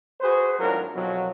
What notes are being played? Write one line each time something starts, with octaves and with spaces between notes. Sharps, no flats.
F#4 G#4 B4 C5
G#1 A2 F#3 D4 F4 A#4
C2 F2 B2 F#3